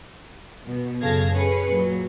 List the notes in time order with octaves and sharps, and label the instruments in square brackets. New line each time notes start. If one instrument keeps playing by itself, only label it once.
[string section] B2
F#2 C#3 A4 F5 G#6 A#6
C#4 G#4 B4 C#7
A#2 F#3